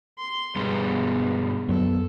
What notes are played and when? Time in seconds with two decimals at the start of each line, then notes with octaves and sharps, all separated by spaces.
0.18 C6
0.56 G2 B2 G3 G#3 B3
1.69 F#2 F#3 B3 A4